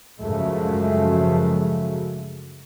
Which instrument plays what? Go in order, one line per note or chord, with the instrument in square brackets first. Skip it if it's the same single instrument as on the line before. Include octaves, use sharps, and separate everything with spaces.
[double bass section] F#2 C#3 F3 F#3 G#3 A3